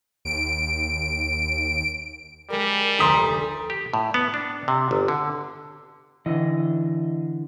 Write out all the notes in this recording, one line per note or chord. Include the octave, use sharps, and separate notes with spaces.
D#2 D7
G3 G#3 A#4
F1 D2 A#5 C6 D#6 B6
G4
A2
B3
D4
C3
G1
D3
D3 E3 D#5